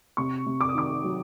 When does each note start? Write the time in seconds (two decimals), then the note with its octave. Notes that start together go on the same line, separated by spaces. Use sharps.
0.17 C3 C#6
0.46 C3
0.61 D6
0.69 D#6
0.75 D#3 D6
1.04 F#3